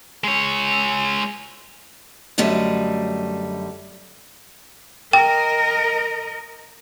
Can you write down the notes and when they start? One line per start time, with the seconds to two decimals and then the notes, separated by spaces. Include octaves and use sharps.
0.24 G#3 C#5
2.38 F#2 D3 G3 A3 D#5
5.13 A#4 D#5 G5